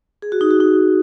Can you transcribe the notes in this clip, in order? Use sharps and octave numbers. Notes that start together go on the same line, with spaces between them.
G#4
F#4
D#4
F#4
D#4